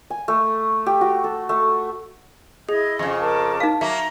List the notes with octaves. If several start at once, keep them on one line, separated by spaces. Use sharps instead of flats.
G#5
A3
G4
F#4
A4
A3
E4 G#4 D#5 G#6
F2 C#3
A#4 A5 D6
D#4 F5
F#3 A#3 E5 A#5